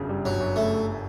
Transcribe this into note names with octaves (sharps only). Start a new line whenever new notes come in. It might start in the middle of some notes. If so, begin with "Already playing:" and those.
Already playing: G1 F#2 C#3
G3
G1 F#3
F#2
C#3 A3